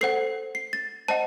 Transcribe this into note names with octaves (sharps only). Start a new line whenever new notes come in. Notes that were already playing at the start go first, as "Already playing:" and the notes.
A4 C5 F#5 C7
C7
A6
C5 D#5 F#5 A5